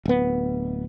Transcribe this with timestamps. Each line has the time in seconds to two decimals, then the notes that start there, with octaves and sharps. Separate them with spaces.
0.06 D1 B3